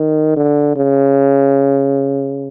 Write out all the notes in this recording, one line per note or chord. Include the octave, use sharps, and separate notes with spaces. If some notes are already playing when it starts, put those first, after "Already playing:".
Already playing: D#3
D3
C#3